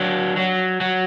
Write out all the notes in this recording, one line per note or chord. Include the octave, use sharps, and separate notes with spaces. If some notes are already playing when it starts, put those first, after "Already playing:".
Already playing: F#3 D4
F#3
F#3